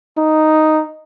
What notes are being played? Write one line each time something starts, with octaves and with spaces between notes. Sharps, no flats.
D#4